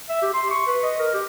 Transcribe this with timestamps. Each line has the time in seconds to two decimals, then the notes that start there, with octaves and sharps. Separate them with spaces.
0.09 E5
0.22 G4
0.34 C6
0.51 C#6
0.67 B4
0.83 D#5
0.99 A#4
1.13 G4